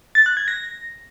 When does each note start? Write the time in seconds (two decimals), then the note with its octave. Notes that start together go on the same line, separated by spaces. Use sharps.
0.15 A6
0.26 F#6
0.37 G#6
0.48 A#6